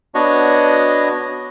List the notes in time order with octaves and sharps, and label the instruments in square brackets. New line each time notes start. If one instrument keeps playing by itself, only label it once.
[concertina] B3 D4 F#4 C#5 D#5